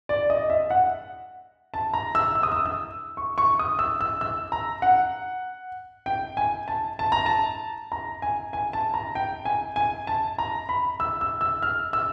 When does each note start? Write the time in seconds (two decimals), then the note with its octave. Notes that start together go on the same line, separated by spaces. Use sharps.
0.09 D5
0.30 D#5
0.50 E5
0.70 F#5
1.74 A5
1.94 A#5
2.15 E6
2.35 E6
2.43 D#6
2.52 E6
2.66 E6
3.17 C#6
3.38 C#6
3.59 D#6
3.79 E6
4.01 E6
4.21 E6
4.52 A#5
4.82 F#5
6.06 G5
6.37 G#5
6.68 A5
6.99 A5
7.12 A#5
7.26 A5
7.92 A#5
8.22 G#5
8.53 G#5
8.73 A5
8.94 A#5
9.15 G5
9.45 G#5
9.76 G#5
10.07 A5
10.38 A#5
10.69 B5
11.00 E6
11.21 E6
11.41 E6
11.62 F6
11.93 E6